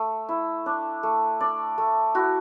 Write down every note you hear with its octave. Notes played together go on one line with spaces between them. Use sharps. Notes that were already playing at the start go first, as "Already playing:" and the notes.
Already playing: A3
E4
D4
A3
D4 D5
A3
E4 F#4